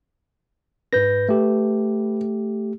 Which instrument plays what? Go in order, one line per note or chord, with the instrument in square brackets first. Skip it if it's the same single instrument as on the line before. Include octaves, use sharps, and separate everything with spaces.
[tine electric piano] G#2 G6 A#6 [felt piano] B4
[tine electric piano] A3 G4